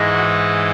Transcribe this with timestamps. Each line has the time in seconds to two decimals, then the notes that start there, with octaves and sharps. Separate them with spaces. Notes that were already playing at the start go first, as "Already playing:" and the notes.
Already playing: G#2 E3 G#3 D#4
0.12 F#4